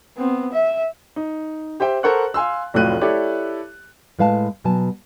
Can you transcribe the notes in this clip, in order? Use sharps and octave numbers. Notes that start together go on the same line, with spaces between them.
B3 C4
E5
D#4
G4 C5 E5 G5
A4 A#4 C5 F#5 C#6 F#6
F5 G#5 C6 E6
F1 A2 F#3 F4 F#6 D#7
E4 G4 A4 C#5 D5
A2 G#3 B4 F5 G#5 A5
B2 F#3 G#5 A5